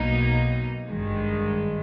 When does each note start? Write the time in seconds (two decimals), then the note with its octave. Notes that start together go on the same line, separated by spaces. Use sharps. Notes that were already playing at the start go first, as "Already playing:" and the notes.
Already playing: B1 B2 A#3 D#4
0.89 G#1 G2 D#3 G#3